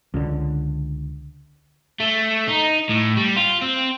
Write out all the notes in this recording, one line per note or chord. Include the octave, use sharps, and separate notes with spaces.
C#2 D3
A3
D#4
A2
G3
F4
C4